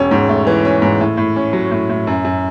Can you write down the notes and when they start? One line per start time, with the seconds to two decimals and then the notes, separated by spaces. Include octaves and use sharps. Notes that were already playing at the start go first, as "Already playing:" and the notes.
Already playing: E1 C#4
0.11 G#2
0.29 A3
0.47 E3
0.65 C#4
0.82 G#2
1.01 A2
1.17 A2
1.36 C#4
1.53 F#3
1.71 A2
1.89 A2
2.07 F#2
2.25 F#2